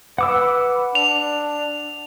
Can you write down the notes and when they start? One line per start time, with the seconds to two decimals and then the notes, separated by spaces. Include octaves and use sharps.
0.18 B4 F#5 D6 E6
0.95 D4 F7